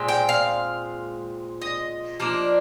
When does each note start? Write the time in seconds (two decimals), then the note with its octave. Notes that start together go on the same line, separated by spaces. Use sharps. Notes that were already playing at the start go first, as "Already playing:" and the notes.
Already playing: A#2 G#3 C4
0.08 G5
0.29 F5
1.62 D#5
2.20 F3 A#3 D4